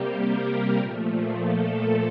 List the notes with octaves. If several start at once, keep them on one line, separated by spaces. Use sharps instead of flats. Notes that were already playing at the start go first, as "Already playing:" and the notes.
Already playing: C3 G3 A#3 G4
A#4
A#2 F3 A3
A4